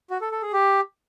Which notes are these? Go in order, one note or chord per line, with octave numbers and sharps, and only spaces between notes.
F#4
A4
A4
G#4
G4